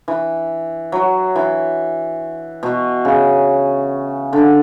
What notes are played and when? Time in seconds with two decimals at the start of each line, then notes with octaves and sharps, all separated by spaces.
0.08 E3
0.92 F#3
1.36 E3
2.63 B2
3.05 C#3
4.33 D3